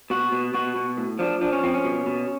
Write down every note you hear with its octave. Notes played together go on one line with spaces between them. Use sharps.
B2 F#4
B2
B2 F#4
B2
A2
F3 D4
F3 D4
C#4
F3 C4
C#4
B2
B2